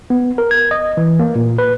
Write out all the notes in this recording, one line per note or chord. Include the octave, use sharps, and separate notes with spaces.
B3
A#4
G#6
D#5
E3
A#3
A#2
B4